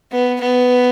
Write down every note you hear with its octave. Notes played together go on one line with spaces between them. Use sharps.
B3
B3